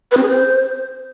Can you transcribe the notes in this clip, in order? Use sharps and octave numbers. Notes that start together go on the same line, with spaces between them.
B4
C4
G#4
C5